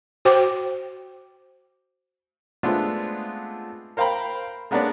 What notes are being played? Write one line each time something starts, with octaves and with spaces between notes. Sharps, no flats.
F#4 C5 G5 D6
G#3 A3 B3 C4 D4 F4
A#4 C5 F5 G5 A#5 B5
G#3 A#3 B3 C#4 D4 D5